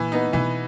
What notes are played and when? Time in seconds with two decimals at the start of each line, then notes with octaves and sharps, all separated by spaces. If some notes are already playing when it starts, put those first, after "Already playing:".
Already playing: A#2 E3
0.12 B3 D#4
0.33 B2 E3